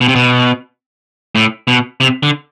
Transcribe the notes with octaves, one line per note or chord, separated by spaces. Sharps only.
B2
C3
B2
A2
B2
C3
D3